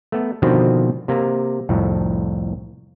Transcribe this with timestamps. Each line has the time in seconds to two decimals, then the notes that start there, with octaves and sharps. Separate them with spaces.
0.12 A3 B3
0.42 B2 D3 D#3 F3 B3 C4
1.08 C3 A#3
1.69 C2 F2 A2